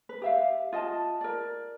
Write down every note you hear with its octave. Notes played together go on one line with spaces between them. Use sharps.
B4
G4 E5 F5
F4 D#5 G5 A5
A#4 D5